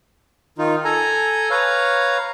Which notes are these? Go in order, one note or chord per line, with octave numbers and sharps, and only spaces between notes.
D#3 D#4 F4
A4 G#5 A#5
B4 C#5 F5 A#5